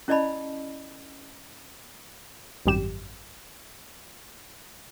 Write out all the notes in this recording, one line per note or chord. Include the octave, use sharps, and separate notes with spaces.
C#4 E4 D5 D#5 A5 B5
G#1 F#2 G3 G4 E7